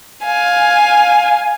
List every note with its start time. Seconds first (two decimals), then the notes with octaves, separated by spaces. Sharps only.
0.23 F5 G#5